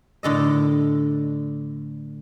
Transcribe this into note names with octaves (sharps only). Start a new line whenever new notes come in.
A2 D3 A4 D#5